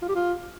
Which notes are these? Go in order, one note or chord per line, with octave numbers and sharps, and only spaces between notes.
F4
G4
F4